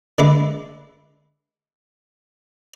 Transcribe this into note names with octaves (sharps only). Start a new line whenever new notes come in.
D3 G#3 B4 E5 D6